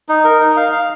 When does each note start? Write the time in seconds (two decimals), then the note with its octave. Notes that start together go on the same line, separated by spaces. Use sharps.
0.09 D#4
0.25 A#4
0.41 D#4
0.56 F5
0.72 F5